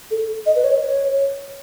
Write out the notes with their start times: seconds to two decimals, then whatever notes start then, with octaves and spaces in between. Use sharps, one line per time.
0.11 A4
0.46 D#5
0.56 B4
0.64 C#5
0.82 C#5